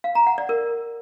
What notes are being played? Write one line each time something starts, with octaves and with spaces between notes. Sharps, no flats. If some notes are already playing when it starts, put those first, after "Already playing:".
F5
A#5
F#5
D5
A#4